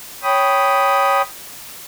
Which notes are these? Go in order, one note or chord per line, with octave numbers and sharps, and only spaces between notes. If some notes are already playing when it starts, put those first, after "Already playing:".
C#5 G5 B5 D#6